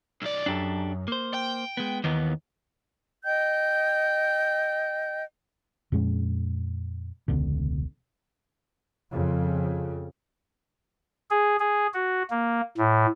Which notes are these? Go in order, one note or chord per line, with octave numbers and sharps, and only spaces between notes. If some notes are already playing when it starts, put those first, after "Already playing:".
B1 D5
F#2 D4 G4 A4
A#3 C5
G5
G#3 B3
D#2 D#3 E3 B3
D#5 G5 G6
F2 A#2 G#3 C#4
E1 C#2 B2 D3
F2 C#3
G#4
G#4
F#4
A#3
A2